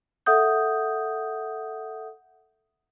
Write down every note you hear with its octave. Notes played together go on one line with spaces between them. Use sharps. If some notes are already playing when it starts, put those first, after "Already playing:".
A4 E5 F#5 D#6 G6